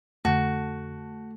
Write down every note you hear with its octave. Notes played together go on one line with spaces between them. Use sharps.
F2 D3 A3 F#4